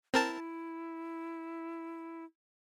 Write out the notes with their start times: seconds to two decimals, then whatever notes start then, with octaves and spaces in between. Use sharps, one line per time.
0.14 C4 E4 A#4 A5